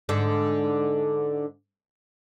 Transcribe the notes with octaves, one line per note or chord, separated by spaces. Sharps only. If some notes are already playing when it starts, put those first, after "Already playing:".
G#2 D3